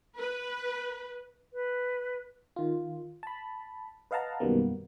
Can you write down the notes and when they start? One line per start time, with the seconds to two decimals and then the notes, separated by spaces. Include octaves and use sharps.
0.18 B4
1.53 B4
2.56 D#3 F4
3.23 A5 B5
4.11 B4 D#5 F5 F#5 A5 A#5
4.40 F#2 B2 D#3 G3 A#3 B3